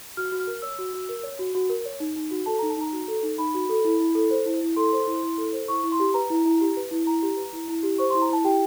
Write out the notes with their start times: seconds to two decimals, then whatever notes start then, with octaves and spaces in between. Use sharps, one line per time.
0.17 F#4 F6
0.32 F#4
0.40 F6
0.47 A#4
0.62 C#5 E6
0.78 F#4
0.93 F#4
1.09 A#4
1.23 C#5
1.39 F#4
1.55 F#4
1.69 A#4
1.85 C#5
2.00 D#4
2.16 D#4
2.31 F#4
2.46 A4 A5
2.59 A#5
2.62 D#4
2.70 A5
2.77 D#4 A#5
2.93 F#4
3.08 A4
3.23 D#4
3.38 D#4 B5
3.54 F#4
3.69 A4
3.84 E4
4.00 E4
4.15 A4
4.31 C5
4.46 E4
4.62 E4
4.76 A4 C6
4.93 C5
5.07 E4
5.23 E4
5.38 A4
5.53 C5
5.68 E4 C#6
5.83 E4
5.92 C6
6.00 G4
6.14 B4 A#5
6.30 E4
6.46 E4
6.61 G4
6.77 B4
6.91 E4
7.06 E4 A#5
7.22 G4
7.37 B4
7.53 E4
7.68 E4
7.83 G4
7.98 C5 C#6
8.10 C6
8.15 E4
8.22 A#5
8.29 E4 A5
8.44 G4 G5